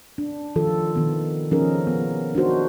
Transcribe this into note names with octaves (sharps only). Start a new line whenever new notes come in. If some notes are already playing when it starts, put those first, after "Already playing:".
D4
D#3 F3 F4 A4
D#3 B3
F3 C#4 D#4 G#4 A#4
B3
D4 D#4 F#4 C5